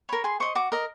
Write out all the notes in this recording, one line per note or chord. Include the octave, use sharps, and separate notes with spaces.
A#4 C#5 B5
G#4 C6
C5 D#5 C#6
F#4 D6
A#4 D#5